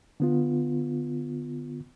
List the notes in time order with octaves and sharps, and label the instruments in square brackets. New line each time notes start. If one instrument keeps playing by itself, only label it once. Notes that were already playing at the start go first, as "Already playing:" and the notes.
[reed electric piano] D3 B3 F4